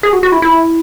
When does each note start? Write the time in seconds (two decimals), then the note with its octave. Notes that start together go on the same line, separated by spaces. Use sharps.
0.03 G#4
0.13 F#4
0.23 F#4
0.32 E4
0.42 E4